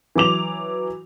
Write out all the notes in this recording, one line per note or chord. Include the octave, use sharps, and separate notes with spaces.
E3 F#3 D6 F7